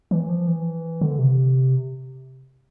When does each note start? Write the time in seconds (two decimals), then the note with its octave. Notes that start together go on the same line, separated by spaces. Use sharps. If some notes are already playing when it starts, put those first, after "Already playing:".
0.11 E3
0.29 F3
0.47 E3
1.01 D3
1.19 C3